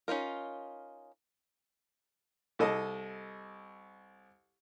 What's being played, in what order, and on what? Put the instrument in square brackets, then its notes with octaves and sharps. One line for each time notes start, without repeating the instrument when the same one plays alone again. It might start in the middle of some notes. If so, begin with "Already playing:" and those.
[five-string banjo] C#4 D#4 F4 A#4
[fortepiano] C2 A4 D#5